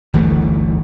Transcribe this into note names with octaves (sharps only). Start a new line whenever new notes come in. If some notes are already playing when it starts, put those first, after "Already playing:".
G1 D2 E3 A3